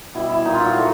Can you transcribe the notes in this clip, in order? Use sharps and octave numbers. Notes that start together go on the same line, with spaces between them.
B2 G3 E4
E4
A#2 G3 D#4
F4
F#4
A2 F#3 A3